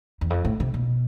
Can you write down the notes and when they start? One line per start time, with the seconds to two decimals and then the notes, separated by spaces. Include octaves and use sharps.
0.21 E2
0.30 F2
0.45 A2
0.60 C3
0.74 B2